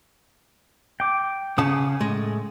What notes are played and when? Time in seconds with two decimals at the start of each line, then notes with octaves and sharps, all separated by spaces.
1.00 G5 D6
1.58 C#3 F#5 G#5 A5 D#6
2.00 A2 G#3